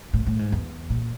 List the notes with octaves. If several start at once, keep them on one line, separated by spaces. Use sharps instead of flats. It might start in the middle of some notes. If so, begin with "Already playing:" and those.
A2
A2
G#2
E2
A#2